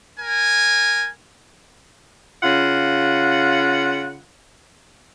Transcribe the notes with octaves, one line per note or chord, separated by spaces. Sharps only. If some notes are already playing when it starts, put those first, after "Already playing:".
A#4 G#5
C#3 F4 F#5